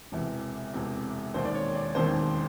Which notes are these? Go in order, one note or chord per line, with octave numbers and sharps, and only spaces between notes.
E1 E2 C3
E1 E2 C3
E1 D#2 D#3 C5
D5
C#5
D5
E1 D#2 D#3 C5